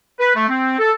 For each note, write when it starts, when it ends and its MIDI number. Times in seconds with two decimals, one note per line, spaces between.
0.19 0.32 71
0.35 0.48 57
0.49 0.76 60
0.79 0.92 69